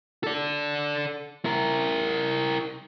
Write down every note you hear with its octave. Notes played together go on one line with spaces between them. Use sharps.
A4 D5
E4 A#4